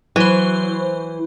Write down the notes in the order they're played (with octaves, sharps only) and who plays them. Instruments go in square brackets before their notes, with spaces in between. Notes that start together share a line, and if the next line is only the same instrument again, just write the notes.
[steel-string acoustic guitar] E3 [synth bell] F#3 C5